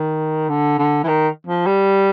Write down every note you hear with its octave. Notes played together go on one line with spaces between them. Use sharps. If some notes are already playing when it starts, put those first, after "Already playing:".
Already playing: D#3
D3
D3
E3
D#3
F3
G3